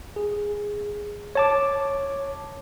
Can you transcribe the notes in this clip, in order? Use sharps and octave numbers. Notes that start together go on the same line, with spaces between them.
G#4
C#5 A5 D6